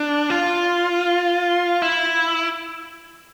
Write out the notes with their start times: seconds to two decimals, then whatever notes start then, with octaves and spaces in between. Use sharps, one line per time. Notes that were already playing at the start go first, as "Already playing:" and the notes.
Already playing: D4
0.30 F4
1.82 E4